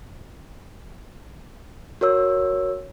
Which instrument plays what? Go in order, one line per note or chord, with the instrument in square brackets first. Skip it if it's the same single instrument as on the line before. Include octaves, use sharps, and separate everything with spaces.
[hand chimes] F#4 A#4 C#5 E6